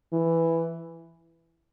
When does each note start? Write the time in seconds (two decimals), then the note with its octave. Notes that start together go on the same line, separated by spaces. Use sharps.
0.13 E3